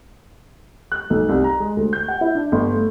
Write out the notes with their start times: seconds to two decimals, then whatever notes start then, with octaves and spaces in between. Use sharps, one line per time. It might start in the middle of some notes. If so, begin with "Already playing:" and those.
0.92 F#6
1.10 B1
1.29 C2
1.44 A#5
1.60 G#3
1.77 D2
1.93 G6
2.08 F#5
2.21 E4
2.35 D4
2.52 G1
2.73 A3